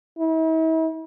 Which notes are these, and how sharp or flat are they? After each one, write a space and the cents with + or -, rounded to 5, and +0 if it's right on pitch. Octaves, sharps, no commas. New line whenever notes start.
E4 -45